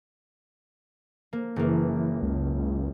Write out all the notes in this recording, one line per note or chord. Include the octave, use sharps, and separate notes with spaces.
A#3
F#1 E3 A#3
C#2
C#2